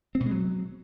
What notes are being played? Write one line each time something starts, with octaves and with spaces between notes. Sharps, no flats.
C4
B2
G#3
F#3